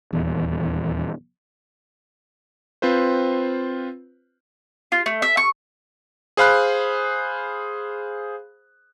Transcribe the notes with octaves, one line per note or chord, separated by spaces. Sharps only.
D#1 E2
C4 F4 B4 C5
F4
A3
E5
C#6
G#4 C5 F5 B5 F#6